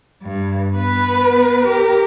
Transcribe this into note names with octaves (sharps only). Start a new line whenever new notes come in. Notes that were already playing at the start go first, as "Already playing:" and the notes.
G2
B3 B4
G4 A#4